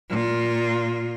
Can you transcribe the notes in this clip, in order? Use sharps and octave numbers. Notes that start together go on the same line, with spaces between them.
A#2 F4